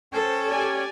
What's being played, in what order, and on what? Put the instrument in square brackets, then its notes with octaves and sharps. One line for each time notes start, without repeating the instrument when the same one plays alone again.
[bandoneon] C#4 C#5 G5 [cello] A4 [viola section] C5
[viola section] G4 D5 G#5